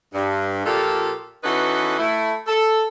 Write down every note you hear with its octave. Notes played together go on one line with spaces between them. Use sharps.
G2
A#2 F3 F4 G4 A4
E3 C#4 D#4 F#4 A4 B4
A3 E4
A4